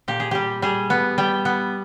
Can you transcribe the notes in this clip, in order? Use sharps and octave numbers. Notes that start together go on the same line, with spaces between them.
A#2 G4
G#4
G3 G4
G3 G#4
B3
G3 G5
B3